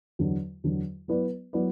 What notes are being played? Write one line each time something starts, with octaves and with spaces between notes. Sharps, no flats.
E2 D3 F#3
E2 D3 F#3
F#3 B3 E4 B4 D5
F#3 B3 E4 B4 D5